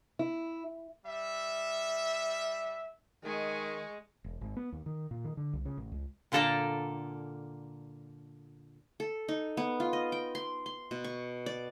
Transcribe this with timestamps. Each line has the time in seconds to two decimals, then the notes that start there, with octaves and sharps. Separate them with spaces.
0.19 E4
1.05 G3 E5
3.25 D#3 G#3 G#5 C#6
4.24 E1
4.41 G#1
4.57 B3
4.72 D#2
4.86 D#3
5.11 A#2
5.25 D#3
5.37 D3
5.53 C2
5.65 C#3
5.77 A1
5.92 C#2
6.32 A#2 D3 A#3 A4 D5 A#5
9.00 A4
9.29 D#4
9.57 B3
9.80 F4
9.93 D#5
10.12 G5
10.35 C6
10.66 C6
10.91 B2
11.04 C#6
11.46 D5